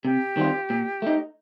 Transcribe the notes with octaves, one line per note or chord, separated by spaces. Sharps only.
C3 G4
D#3 G3 C4 F4
A#2
A3 D#4